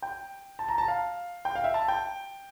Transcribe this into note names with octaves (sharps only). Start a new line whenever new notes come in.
G5
A5
A#5
A5
F5
G5
F5
E5
A5
G5